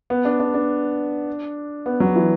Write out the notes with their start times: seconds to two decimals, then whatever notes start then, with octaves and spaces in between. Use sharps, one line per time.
0.10 B3
0.25 D4
0.40 D4
0.54 D4
1.86 B3
2.00 F#3
2.16 E3